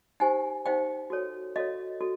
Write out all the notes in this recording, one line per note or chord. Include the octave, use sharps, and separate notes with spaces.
D#4 G4 C5 F#5 G#5
D#4 G4 C5 F5 G5
F#4 A4 C#5
F#4 A4 C#5 D#5 F5
F#4 A4